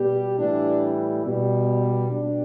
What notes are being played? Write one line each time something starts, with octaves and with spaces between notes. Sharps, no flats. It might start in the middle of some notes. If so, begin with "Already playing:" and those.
Already playing: B2 G3 G4
A2 E3 G3 D4
B2 G3
B2 G3 D4